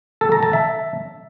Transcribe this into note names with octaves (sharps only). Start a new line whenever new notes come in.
A4
A#5
A5
E5